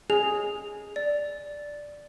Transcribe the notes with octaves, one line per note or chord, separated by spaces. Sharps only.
G#4 F7
D5